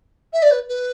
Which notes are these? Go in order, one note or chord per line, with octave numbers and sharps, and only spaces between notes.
E5
D5
B4
B4